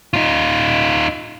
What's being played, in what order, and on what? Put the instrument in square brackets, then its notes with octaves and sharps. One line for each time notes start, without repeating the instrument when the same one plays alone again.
[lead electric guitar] D#4 F4